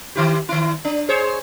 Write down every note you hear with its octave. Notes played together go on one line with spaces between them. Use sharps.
D#3 E4 G4
D#3 E4
D4
G#4 C5 C#5